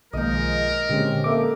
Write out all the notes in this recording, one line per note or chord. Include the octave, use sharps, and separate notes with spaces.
B1 D#3 F3 G#3 A#3 D#4 A#4 D#5
A#2 D3 G#3 C4 C#4 G4
A#3 A4 E5 D6